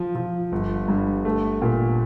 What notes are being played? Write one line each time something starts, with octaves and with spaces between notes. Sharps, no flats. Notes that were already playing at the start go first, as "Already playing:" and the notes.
Already playing: F3
F3
G1
G2
A3
A#2